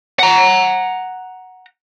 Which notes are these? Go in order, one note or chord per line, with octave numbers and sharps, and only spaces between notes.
F#5 A#5